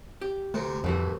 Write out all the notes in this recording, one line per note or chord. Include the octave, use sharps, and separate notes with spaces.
G4
D2 A2 C3 A3
C2 F2 A2 E3 F#4